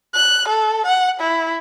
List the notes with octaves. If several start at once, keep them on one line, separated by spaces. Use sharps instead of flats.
F#6
A4
F#5
E4